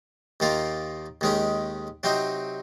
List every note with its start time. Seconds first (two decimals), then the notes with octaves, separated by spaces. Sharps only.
0.40 D#2 D#3 A#3 F4
1.21 D#2 D#3 G#3 C#4
2.03 C3 F#3 C4 D#4